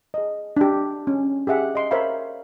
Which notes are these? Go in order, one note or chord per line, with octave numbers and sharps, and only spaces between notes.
G#4 D#5
D4 G4
C#4
G4 G#4 E5 F#5
D#5 C6
A#4 C5 C#5 E5 F5 B5